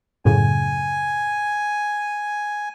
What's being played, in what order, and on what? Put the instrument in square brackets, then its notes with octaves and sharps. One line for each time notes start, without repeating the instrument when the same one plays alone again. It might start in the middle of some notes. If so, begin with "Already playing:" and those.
[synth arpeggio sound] F#2 A2 C#3 [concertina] G#5